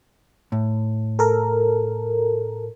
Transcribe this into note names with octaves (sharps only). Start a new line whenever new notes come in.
A2
A4 A#4